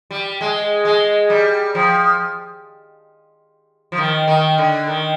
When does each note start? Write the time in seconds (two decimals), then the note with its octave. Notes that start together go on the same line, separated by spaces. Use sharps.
0.11 G3
0.41 G#3
0.85 G#3
1.30 G3
1.75 F3
3.92 F3
3.98 D#3
4.28 D#3
4.58 D3
4.87 D#3